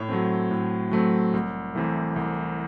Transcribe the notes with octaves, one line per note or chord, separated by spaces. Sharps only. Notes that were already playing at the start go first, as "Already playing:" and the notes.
Already playing: A2 C#5
F#3 A3 C4
A2
F#3 A3 C4
C2
C3 E3 A3
C2